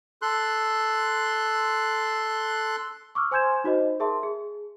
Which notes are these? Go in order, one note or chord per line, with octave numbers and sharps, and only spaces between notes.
A4 C6 F#6
C#6 D6 E6 F6
C5 G#5 C6 G6 G#6 E7
D#4 F#4 C5 D#5
G#4 A#4 E5 A5 C6
G#4